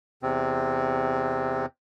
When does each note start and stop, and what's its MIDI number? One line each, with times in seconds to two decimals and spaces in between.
0.23 1.66 40
0.23 1.66 48
0.23 1.66 60